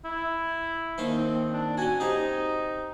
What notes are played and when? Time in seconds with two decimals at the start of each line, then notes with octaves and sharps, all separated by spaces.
0.05 E4
0.98 D#2 D#3 C5
1.15 C4
1.52 D4
1.77 C#4 F#4 G#5
2.00 C4 D#4 G4